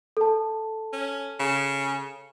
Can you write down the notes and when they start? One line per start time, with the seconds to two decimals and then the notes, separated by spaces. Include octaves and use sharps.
0.17 A4 A5
0.93 C#4
1.40 C#3